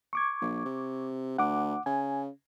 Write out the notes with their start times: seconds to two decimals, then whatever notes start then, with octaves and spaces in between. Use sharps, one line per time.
0.13 C#6 D6 G#6
0.41 A#1
0.65 C3
1.38 D2 F#5 D6
1.86 C#3 G#5